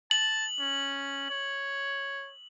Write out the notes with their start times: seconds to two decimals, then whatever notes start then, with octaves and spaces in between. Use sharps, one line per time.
0.11 A5 F#7
0.59 C#4
1.30 C#5